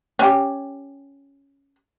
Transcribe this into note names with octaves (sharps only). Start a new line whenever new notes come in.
C#4 G4